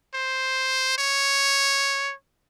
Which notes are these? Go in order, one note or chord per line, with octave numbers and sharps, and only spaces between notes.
C5
C#5